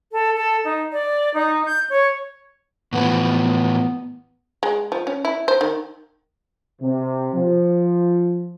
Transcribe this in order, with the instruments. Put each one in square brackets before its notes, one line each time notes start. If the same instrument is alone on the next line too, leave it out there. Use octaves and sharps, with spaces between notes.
[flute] A4
A4
D#4
D5
D#4
G6
C#5
[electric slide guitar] A2 E3 F3 [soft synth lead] B3
[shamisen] G#3
F3
C#4
E4
C5
D#3
[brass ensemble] C3
F3